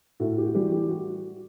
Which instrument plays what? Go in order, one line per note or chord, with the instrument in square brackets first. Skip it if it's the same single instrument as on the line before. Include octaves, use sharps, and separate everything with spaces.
[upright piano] A2 F#4 A4
G4
F#4
E3 G3 G4
G4
F#4